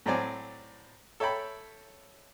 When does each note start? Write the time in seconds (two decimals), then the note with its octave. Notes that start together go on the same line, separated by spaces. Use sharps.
0.06 A2 F#3 C4 D5 G#5
1.20 A4 C#5 E5 G5 B5